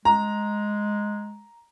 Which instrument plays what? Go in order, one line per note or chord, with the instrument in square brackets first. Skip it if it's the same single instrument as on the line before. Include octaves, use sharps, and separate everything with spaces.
[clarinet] G#3 [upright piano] A#5